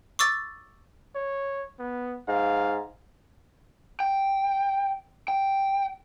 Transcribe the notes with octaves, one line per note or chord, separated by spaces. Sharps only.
C#6 D6 E6 A6
C#5
B3
G#2 F5
G5
G5